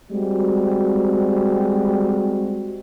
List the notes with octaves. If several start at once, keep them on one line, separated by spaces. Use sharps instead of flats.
G3 G#3 C4 F#4